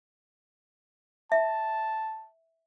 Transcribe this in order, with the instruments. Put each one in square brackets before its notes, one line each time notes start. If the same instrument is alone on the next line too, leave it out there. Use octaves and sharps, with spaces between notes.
[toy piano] E5 [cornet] A5